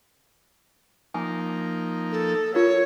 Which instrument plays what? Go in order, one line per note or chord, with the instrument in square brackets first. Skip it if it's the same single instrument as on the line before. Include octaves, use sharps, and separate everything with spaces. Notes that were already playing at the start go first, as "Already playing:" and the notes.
[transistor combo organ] F3 A#3 D#4 [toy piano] G#5 D6
[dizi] A4
[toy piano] F4 A#4 F5 [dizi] C#5